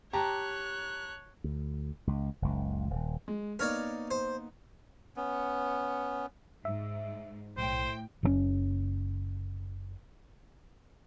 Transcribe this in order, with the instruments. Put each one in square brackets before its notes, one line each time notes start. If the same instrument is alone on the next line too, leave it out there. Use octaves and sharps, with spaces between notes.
[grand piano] G4 A5 A#5 [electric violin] C#5 F#6
[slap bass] D2
C#2
F#1 C#2
D#1
[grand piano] G#3
[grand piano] A#3 B3 D#4 [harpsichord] A#4 C#5 D5
[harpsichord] C5
[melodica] B3 C#4
[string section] G#2 [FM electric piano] E5
[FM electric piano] B1 [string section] A2 G5 [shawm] C5
[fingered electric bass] F#1 C#3 C#4